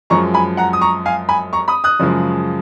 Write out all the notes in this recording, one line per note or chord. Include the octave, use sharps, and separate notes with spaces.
F#2 F3 G#3 A#5 C#6
G#5 B5
F#5 A#5
D#6
A#5 C#6
F5 G#5
G#5 B5
A#5 C#6
B5 D#6
D#6 F#6
F#2 C#3 F3 G#3